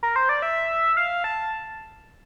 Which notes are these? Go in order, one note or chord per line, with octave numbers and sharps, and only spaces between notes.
A#4
C5
D5
E5
F5
A5